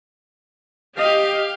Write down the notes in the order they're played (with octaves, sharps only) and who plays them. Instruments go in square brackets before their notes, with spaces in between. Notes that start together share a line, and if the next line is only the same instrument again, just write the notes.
[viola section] G4 F5 [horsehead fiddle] D#5